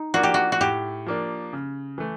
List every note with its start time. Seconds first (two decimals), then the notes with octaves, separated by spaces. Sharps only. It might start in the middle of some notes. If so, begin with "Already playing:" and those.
Already playing: D#4
0.14 F3 A#3 D4 F#4
0.23 G4
0.34 F#4
0.52 F#4
0.61 A2 G4
1.06 F3 A#3 D4
1.53 C#3
1.98 E3 A3